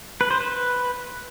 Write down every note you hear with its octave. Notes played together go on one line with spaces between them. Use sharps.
B4
C5
B4